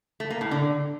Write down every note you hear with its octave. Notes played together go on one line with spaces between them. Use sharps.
A3
A#3
A2
D3